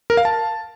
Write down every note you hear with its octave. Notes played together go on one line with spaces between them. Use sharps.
A#4
F5
A5